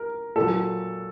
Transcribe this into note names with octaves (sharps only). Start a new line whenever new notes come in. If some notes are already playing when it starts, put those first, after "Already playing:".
Already playing: A#4
A#2 F#3 A4